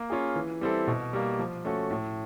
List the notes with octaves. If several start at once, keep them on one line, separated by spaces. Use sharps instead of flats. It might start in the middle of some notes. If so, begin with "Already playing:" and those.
Already playing: A#3
C#4 F4 G#4
E3
G3 C4 E4 A4
B2
G3 A#3
F3
A3 C#4 F#4 A4
A2